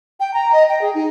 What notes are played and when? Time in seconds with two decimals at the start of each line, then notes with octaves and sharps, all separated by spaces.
0.20 G5
0.34 A#5
0.53 D#5
0.69 G5
0.82 G#4
0.95 D#4